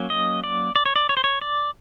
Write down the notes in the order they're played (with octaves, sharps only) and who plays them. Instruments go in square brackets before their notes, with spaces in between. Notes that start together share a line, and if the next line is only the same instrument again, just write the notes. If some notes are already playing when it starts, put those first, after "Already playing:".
Already playing: [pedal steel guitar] F#3 A#3 C#4
D#5
D5
D5
C#5
D5
C#5
C5
C#5
D5